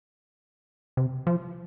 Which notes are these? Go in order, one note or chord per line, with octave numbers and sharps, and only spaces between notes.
C3
F3